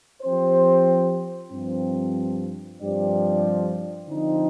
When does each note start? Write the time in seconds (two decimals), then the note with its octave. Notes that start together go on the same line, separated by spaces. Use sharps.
0.22 F3 C4 G4 C5
1.52 G2 F3 C4
2.80 G2 F3 C4 G4 D5
4.09 D3 F3 C4 D#4